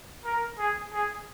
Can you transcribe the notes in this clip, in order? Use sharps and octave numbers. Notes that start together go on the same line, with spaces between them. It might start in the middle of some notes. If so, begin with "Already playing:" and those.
A#4
G#4
G#4